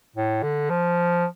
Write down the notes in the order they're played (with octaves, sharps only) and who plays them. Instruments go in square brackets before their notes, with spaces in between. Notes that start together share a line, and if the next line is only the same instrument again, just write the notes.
[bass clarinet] A2
D3
F3